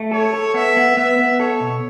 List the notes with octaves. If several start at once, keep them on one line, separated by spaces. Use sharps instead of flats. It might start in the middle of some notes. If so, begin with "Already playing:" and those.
Already playing: A3
A4 C#5
A4
B3 E5
B3
B3 E5
B3
A4 C#5
B2